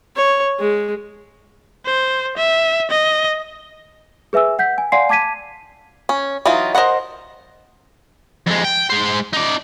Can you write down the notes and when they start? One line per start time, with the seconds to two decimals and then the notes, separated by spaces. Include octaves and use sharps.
0.17 C#5
0.60 G#3
1.86 C5
2.37 E5
2.90 D#5
4.33 G#4 B4 E5 G#5 E6
4.59 F#5 G6 B6
4.78 G#5
4.92 D5 F5 F#5 G#5 C6 C7
5.09 A5 D6 G#6 B6 D#7
6.09 C#4
6.46 E3 F#3 D#4 F4
6.75 A#4 C5 D5 D#5 F#5
8.46 F2 G#3
8.64 G5
8.90 G#3 C5
9.33 D#4 D5